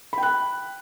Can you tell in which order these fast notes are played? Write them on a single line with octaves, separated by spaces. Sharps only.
B5 G5 F#6